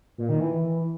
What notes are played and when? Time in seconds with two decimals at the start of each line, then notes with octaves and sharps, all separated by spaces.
0.18 A#2
0.29 D#3
0.40 E3